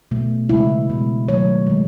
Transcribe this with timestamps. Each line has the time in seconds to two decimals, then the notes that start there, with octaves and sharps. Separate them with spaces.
0.11 B2 A3
0.49 C#3 G#3 E4
0.90 B2 G#3
1.28 D#3 F#3 A3 C#5
1.67 D#3 G#3